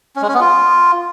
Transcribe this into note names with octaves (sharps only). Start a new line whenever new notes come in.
C#4
G#3
C#4
B3
F4